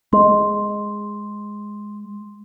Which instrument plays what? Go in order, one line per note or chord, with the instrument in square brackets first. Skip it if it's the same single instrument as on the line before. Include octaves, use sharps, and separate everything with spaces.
[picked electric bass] G#3 [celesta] C6